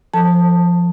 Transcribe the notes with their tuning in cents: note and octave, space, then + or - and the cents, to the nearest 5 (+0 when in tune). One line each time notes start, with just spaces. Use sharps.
F3 +0 A4 +20 A5 +10